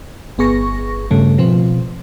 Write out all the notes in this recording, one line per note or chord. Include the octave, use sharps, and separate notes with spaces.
G1 B3 G#4 C#6 A#6
G2 C#3 A3
B2 F3 C4